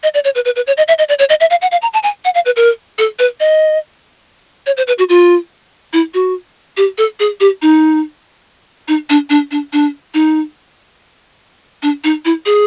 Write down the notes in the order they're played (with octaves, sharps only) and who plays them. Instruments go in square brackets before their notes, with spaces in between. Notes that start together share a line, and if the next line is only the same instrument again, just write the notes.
[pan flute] D#5
D5
C#5
B4
B4
B4
C#5
D#5
E5
D#5
D5
C#5
D#5
E5
F5
F#5
F5
A#5
A5
G#5
F#5
F5
B4
A#4
A4
B4
D#5
C#5
C5
B4
F#4
F4
E4
F#4
G4
A4
G#4
G4
D#4
D#4
D4
D4
D4
D4
D#4
D4
D#4
E4
G#4